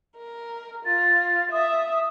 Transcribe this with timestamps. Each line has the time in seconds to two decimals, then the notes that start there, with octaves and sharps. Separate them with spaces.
0.17 A#4
0.85 F4 A6
1.52 E5 D#6